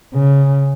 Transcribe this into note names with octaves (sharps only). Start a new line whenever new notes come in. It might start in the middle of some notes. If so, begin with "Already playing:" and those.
C#3